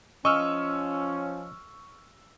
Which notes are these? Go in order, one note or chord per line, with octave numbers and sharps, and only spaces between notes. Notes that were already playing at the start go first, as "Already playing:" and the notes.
F3 C#4 D#5 C#6 E6 F6